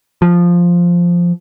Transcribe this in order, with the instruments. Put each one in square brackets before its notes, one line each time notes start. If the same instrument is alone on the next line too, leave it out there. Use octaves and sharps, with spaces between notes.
[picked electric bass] F3